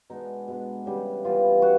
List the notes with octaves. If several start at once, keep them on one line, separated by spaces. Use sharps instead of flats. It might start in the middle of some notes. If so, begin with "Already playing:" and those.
B2 G#3 B3 D4 D#4
B2 G#3 B3 D4
C#3 E3 G3 B3
C#3 E3 G3 B3 F4
B3 F#4